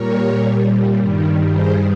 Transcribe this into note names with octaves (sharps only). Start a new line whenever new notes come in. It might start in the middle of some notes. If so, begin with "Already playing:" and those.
Already playing: A#2 G3 A#4 C#5
G2 D#3 G3
G#4 C5